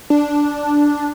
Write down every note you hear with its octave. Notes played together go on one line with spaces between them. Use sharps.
D4